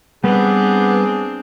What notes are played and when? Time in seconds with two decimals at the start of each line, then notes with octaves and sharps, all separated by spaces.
0.24 G3 B3 C4 D4 G#4 B4